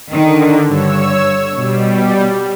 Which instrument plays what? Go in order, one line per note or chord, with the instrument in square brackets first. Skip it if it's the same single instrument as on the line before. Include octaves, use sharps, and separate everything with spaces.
[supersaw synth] D3 [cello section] D#3
[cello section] G2 [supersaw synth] C#5 E6
[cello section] B2 [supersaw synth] G3